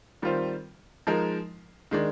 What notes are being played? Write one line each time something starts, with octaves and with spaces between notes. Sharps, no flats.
D#3 G3 C4 F4 C5
F3 G#3 D#4 A#4
D#3 G#3 D4